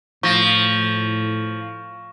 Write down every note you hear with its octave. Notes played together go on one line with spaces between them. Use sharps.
A2 F3 C#6 A#6 E7